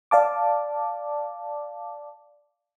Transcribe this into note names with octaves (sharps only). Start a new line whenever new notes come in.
D5 F5 A5 D6